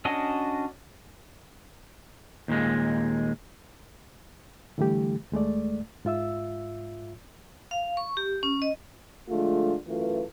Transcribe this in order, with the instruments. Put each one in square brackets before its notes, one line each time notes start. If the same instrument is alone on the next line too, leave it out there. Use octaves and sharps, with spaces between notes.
[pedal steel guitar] C#4 D4 F#4 D#5
[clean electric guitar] D#2 A#2 G#3
[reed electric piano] D3 E3 G3 A3 G4
D#2 G#3 A3 D5
G#2 F4 E5 E6
[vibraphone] F5
C#6
G4
C#4
D#5
[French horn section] D3 F3 G#3 A3 F4
F#2 E3 A3 F4 B4